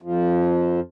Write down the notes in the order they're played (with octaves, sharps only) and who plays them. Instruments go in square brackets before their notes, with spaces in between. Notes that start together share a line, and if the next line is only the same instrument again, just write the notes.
[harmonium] F2 F3